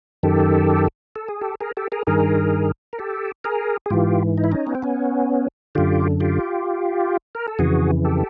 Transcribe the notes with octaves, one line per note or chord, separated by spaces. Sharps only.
F#2 D#3 G4 A4
A4
G#4
G4 A4
G#4 A#4
G4 A4
G#4 A#4
G2 D#3 G#4 A#4
A#4
G4 A4
G#4 A#4
G#4
G#2 E3 F4 G4
D#4
E4
C#4 D#4
B3
C4
B3 C#4
F#2 D3 F4 G4
F4 G4
A#4
A4
F2 C#3 E3 F#4 G#4
G4 A4